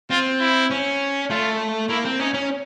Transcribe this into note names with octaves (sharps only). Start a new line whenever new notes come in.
C4 F4
E4
C#4
A3 F4
A#3 E4
C4
C#4 D#4
C#4